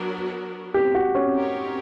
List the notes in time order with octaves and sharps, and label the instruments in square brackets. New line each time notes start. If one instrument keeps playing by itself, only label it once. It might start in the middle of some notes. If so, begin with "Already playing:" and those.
Already playing: [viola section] F#3 B3 D4 F#4 A#4
[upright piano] G4
F#4
C#4
[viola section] C4 D#4 G4 A#4 C#5